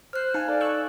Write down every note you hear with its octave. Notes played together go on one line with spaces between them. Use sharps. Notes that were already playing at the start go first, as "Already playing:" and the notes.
C5 F6 F#6
D#4 F5 G#5
A4 D5
C#6 E6 F#6